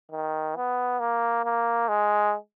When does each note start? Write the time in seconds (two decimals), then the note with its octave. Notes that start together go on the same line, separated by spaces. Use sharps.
0.11 D#3
0.56 B3
1.00 A#3
1.44 A#3
1.88 G#3